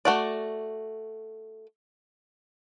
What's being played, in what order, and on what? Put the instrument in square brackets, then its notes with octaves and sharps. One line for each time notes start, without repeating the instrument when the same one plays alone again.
[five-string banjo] A3 F#4 D5